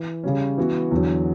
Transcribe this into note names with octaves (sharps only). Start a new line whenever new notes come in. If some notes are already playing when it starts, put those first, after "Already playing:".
Already playing: E3
C#3 G3 C#4
E3 B3 F#4
E2 D3 F#3